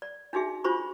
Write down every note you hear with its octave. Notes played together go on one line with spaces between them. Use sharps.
D5
D4 D#4 F#4 G#4 E5
D4 F4 F#4 C5 B5 C#6